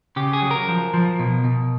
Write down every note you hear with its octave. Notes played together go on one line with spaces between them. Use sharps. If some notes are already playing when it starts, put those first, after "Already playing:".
C#3 G4
G#4
F#3
A#4
F3
F3
B2
B2